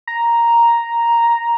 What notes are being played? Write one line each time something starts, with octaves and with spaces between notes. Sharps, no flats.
A#5